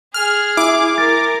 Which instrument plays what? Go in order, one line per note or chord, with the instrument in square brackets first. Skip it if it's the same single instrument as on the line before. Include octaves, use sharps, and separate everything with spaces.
[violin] G#4 [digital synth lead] F6
[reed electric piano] E4 [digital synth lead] D6
[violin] A#4 [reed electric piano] A6